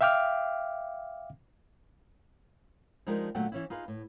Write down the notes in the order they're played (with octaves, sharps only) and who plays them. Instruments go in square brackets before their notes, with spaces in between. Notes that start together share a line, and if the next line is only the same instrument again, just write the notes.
[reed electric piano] E5 F5 G5 D6 F6
[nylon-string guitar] F3 G#3 D4 D#4 G4 A#4
A#2 D3 F#3 A3 F#5 G5
E3 C#4 E4
D#4 F4 G#4 B4
A2